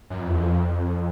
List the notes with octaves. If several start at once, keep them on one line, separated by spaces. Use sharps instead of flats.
F#2
F2
E2
F2